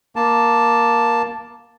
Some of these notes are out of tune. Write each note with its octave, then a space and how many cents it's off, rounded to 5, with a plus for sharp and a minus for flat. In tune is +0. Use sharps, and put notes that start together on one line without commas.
A#3 +10 A5 +0